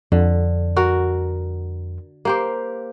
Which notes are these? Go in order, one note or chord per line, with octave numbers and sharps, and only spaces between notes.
F2 D3
F#4 A#4
A#3 G4 C5